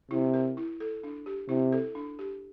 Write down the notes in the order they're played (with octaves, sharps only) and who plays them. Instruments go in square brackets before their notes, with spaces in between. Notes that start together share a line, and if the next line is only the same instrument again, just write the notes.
[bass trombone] C3 [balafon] E4
[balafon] A#4
E4
A4
D4
G4
[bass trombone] C3 [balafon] E4
[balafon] A4
D4
G4